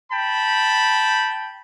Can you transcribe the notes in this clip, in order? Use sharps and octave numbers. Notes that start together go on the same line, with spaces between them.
G5 A5 B5